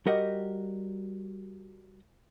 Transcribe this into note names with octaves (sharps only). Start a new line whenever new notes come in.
G3 F#4 G4 A#4 D#5 F#5